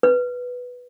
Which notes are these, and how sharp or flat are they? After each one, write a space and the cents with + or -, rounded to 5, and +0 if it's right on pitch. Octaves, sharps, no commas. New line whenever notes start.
B4 +0